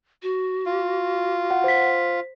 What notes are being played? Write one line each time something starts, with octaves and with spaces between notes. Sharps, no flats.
F#4
F4
F#5
C5 B6